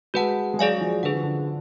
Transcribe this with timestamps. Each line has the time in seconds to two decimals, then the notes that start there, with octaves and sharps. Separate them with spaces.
0.14 G#3 F#4 B4 F#5 A5
0.54 G#3
0.59 F#3 G#4 D5 F5 G#5
0.81 F3
1.03 D3 G#4 B4 F#5
1.14 F3
1.23 D3